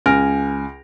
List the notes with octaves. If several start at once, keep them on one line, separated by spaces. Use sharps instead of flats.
C#2 G#5 F6 A#6 D7